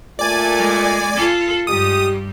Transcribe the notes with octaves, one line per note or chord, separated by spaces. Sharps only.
A#2 A3 D5 G#5
G#3
F4 A4
G2 G3 G#3 G4 D#6